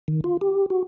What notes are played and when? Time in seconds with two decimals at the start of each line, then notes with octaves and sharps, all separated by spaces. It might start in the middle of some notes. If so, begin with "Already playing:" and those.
0.08 D#3
0.24 F4
0.41 G4
0.70 F#4